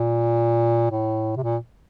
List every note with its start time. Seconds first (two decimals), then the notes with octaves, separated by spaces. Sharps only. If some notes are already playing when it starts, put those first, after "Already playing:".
Already playing: A#2
0.91 A2
1.37 C3
1.43 A#2